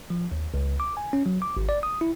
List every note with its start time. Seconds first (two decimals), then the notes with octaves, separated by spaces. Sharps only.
0.10 F3
0.32 D#2
0.54 C#2
0.80 D6
0.97 G#5
1.13 C#4
1.26 F#3
1.42 D6
1.57 G#1
1.69 D5
1.83 D#6
2.01 E4